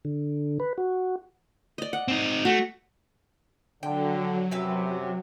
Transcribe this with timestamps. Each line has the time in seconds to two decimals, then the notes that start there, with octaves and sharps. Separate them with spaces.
0.05 D3
0.60 B4
0.78 F#4
1.78 D5 D#5
1.93 F#5
2.08 C4 D#4
2.45 A3 F#4
3.83 D3 F#3 G5
4.51 F#2 C3 G4 B4 E5